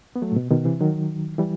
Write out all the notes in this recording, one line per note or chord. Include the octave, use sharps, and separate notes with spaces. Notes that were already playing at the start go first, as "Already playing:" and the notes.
B3
F#3 A3
A2
B2
B2 D#3
C3 E3
D#3 F#3
E3 G3